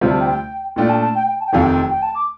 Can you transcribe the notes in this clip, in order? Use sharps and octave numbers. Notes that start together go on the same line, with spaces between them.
D2 C3 G3 C4 F4
A5
G5
G5
A#2 A3 D4 F4 G5
A5
A5
G5
G5
A5
G5
F1 F2 C3 D#3 F5
G5
G5
A5
D6